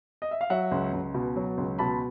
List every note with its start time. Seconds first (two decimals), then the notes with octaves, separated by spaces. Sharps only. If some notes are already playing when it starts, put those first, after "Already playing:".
0.22 D#5
0.31 E5
0.41 F5
0.50 F#3 E5 F#5
0.71 C#2
0.93 C#2
1.14 B2
1.36 F#3
1.57 C#2
1.79 B2 A5 B5